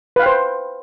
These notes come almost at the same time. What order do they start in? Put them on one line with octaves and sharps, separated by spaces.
B4 F5 G5 C5